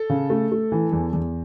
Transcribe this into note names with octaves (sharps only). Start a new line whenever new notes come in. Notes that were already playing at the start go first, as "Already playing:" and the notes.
Already playing: A4
C#3
A3
A3
E3
E2
E2